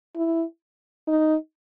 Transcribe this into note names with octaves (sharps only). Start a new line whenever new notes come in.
E4
D#4